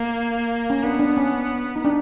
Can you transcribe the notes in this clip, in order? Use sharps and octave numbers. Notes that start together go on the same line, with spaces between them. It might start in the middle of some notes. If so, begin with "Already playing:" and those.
Already playing: A#3
C#4
B3 D4
D4
C#4
D#4
D4